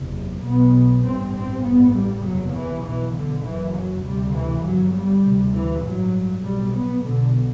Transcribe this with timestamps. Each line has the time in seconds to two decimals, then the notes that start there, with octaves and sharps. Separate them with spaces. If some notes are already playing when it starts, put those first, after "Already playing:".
Already playing: F#1 E2 C3
0.43 B1 B2 B3
1.04 A1 G2 C4
1.35 C4
1.64 A1 G2 B3
1.94 G3
2.24 F#1 E2 C3 F#3
2.54 E3
2.84 B1 B2 E3
3.15 D3
3.44 F#1 F#2 E3
3.75 F#3
4.04 D2 C3 G3
4.34 E3
4.65 G1 G2 F#3
4.95 G3
5.24 D2 C3
5.54 E3
5.84 A1 G2 F#3
6.44 B1 A2 G3
6.74 B3
7.05 B1 B2 D3